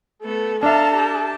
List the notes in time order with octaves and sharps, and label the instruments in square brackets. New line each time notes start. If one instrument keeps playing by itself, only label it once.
[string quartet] A3 B3 A4
[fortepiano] D4 E5 [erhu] A4 [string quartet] F5 A5 A#5
[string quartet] G4 A5